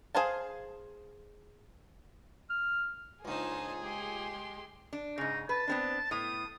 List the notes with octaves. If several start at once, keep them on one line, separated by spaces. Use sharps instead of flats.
G#4 C5 F5 A5
F6
C#2 A#2 D4 D#4 G#4 C5 A5
G#3 G4 C6
D4
G#2 C#3 D#4
B4 A5
B3 C4 D4
A2 B3 D#6